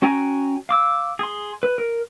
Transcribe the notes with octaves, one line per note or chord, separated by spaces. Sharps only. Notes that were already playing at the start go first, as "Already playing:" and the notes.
C#4 F#4 G5 G#5 A#5
F5 D6 E6
G#4 C6
B4
A#4